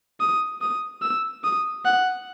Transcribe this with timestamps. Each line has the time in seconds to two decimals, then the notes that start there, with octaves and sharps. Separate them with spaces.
0.21 D#6
0.62 D#6
1.02 E6
1.43 D#6
1.85 F#5